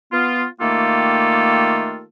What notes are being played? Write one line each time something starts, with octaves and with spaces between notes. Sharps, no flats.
B3 F4
D#3 A3 A#3 F4 G4 A4